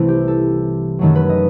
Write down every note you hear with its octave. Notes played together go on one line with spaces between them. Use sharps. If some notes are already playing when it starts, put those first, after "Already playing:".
Already playing: C2 C3 E3 A3 C4 E4
G4
A4
F#2 D#3 F#3 A3 A4
B4
D#5